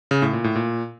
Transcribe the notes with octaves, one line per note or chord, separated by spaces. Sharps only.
C#3
A2
A#2
A2
A#2